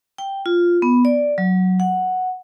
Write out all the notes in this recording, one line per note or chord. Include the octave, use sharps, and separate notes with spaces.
G5
F4
B3
D5
F#3
F#5